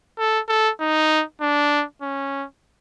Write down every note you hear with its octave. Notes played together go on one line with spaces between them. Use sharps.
A4
A4
D#4
D4
C#4